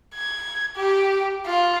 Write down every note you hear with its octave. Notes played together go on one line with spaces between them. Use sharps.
G#6
G4
F4